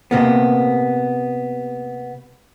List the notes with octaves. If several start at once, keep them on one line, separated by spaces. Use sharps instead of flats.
C3 A#3 B3